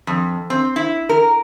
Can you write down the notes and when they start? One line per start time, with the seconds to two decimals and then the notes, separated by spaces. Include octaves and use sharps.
0.07 F2
0.50 C4
0.76 E4
1.09 A#4